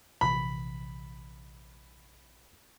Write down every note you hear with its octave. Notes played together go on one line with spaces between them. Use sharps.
A#1 C3 E3 B5